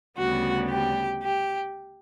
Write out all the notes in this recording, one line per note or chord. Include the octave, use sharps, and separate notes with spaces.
D2 C#3 G3 B3 F#4
G4
G4